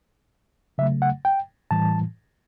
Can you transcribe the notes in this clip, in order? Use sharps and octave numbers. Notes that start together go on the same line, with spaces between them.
C#3 F#3 A3 E5
F#5
G5
A2 E3 G3 A5